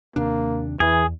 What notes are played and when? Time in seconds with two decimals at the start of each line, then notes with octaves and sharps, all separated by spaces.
0.16 D#2 C3 A#3 D4
0.80 E2 E3 G#4